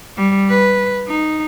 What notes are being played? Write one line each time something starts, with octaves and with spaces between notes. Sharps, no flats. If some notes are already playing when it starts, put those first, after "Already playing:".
G3
B4
D#4